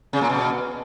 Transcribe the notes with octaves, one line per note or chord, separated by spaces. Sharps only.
C#3
A#2
B2